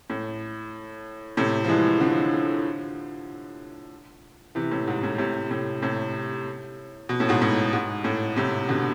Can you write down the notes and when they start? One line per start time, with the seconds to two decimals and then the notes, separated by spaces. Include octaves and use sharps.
0.10 A2
1.37 A2 C3
1.64 F3
1.69 E3 G#3
2.00 D3 F3
4.55 C3 E3
4.71 A2
4.88 G#2
5.03 A2
5.18 A2 C3
5.50 A2 C3
5.82 A2 C3
7.09 B2
7.20 A2
7.29 G#2 B2
7.42 A2
7.73 G#2
8.04 A2
8.36 A2 C3
8.69 B2 D3